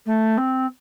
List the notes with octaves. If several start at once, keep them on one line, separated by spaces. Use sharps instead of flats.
A3
C4